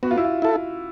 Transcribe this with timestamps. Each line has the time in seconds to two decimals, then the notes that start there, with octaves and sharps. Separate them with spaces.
0.03 B3 F#4
0.11 F4
0.18 E4
0.24 F4
0.42 E4 A4